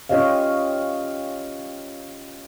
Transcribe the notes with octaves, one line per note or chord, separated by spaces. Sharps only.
C#4 F4 G4 C#5 D#5 F5